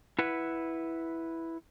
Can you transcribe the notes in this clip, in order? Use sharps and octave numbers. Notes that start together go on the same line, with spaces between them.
E4 B4 F#5